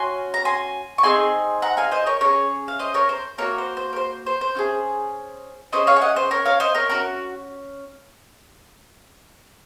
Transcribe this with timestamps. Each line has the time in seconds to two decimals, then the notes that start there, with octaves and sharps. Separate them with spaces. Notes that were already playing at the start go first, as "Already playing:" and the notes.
Already playing: C#4 F#4 G#5 C6
0.34 A#5
0.45 G#5 C6
0.98 C#6
1.03 C4 D#4 G#4 G#5 C6
1.62 F#5 A#5
1.77 F5 G#5
1.92 C5 D#5
2.06 A#4 C#5
2.21 C#4 G#4 A#4 C#5
2.68 F5
2.79 C5 D#5
2.94 A#4 C#5
3.09 C5
3.38 A#3 D#4 F#4 A#4 C#5
3.58 C5
3.77 C5
3.93 A#4
3.96 C5
4.26 C5
4.41 C5
4.55 C#4 F4 G#4
5.72 C#4 F4 G#4 C5 D#5
5.87 C#5 F5
5.96 G#5
6.01 D#5 F#5
6.16 C5
6.31 A#4 C#5
6.45 C#5 F5
6.60 C5 D#5
6.75 A#4 C#5
6.89 C#4 F#4 A#4